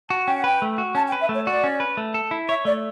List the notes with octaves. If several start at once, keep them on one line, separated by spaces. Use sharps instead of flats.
F#4 A5
C#4 G5
F#5
B4 G5
A3
F#4
C#4 A5
G5
B4
E5
A3
C#5
F#4 D5
C#4
B4
A3
A4
E4
C#5 E5
A3 D5